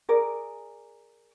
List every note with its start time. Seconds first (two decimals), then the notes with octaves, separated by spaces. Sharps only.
0.09 G#4 A#4 D5